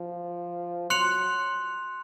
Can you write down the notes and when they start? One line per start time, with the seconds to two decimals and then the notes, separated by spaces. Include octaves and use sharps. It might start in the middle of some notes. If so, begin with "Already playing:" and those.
Already playing: F3
0.90 F#3 C6 F#6 C#7 F7